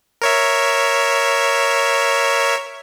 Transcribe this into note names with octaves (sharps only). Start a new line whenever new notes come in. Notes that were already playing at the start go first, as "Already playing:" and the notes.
A#4 C#5 E5